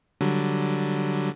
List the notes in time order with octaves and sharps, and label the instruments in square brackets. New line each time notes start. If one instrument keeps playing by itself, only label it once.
[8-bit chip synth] D3 F#3 G3